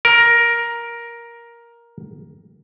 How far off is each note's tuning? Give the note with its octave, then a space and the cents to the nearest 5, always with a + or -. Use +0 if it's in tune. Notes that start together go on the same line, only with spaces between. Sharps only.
A#4 +10